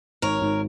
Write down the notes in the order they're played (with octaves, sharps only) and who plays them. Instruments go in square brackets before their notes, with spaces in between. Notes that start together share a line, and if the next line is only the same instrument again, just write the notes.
[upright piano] G#1 [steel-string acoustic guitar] A#4 C#5
[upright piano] G#1